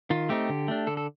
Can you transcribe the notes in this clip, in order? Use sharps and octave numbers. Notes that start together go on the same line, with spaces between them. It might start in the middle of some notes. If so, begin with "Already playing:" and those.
D#3 F4
A3 C4 D#4 G4
D3
A3 D4
D3 A4
A4